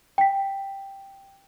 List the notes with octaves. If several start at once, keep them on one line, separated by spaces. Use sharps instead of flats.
G5 B6